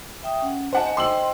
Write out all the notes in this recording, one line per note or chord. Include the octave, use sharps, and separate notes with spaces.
E5 G5 D#6
C#4 F#5
C5 D#5 F#5 G#5 A5
C5 D#5 G5 C6 E6 F#7